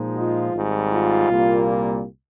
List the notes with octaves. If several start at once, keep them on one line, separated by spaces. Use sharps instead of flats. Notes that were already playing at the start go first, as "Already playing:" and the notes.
Already playing: A#2 F3 G#3 D#4
F4
G#1 G#2 G3
F4
C2 A#2 G3 A#3